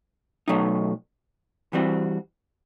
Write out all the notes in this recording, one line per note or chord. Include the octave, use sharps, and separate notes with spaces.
B2 F#3 A3 D#4
E3 G3 C4 F#4